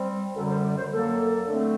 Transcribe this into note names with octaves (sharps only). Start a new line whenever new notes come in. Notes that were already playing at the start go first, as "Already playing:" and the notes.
Already playing: G3 C4
F#2 D3 G3 A4
C5
D5
C5
F#2 F#3 A#3 A4
D3 A3 C4